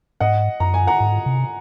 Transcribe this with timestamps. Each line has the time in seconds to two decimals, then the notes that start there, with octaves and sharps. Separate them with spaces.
0.20 G#2 D#5 F#5
0.60 F#2 A#5
0.74 G#5
0.87 F#5 A#5
1.00 G#2
1.26 C3